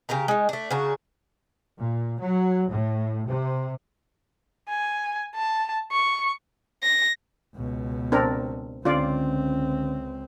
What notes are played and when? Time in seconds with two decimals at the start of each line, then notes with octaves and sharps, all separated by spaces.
0.09 C#3 G4 A#4 A#5
0.28 G#3 D#4
0.49 A3 D4
0.71 C#3 D4 F#4 A#5
1.78 A#2
2.19 F#3
2.69 A2
3.27 C3
4.69 G#5
5.35 A5
5.92 C#6
6.83 A#6
7.55 C#2 B2
8.12 C4 D4 A#4
8.85 C#2 D3 C4 C#4 F4 D5